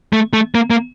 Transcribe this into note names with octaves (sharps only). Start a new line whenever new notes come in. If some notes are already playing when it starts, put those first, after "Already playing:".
A3
A3
A#3
A#3